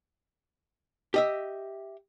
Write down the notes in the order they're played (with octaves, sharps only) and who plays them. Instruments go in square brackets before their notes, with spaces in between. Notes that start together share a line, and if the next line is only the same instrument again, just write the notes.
[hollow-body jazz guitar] G4 D#5 E5